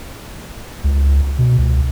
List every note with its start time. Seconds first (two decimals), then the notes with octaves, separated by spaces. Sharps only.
0.84 C#2
1.38 B2
1.58 C#2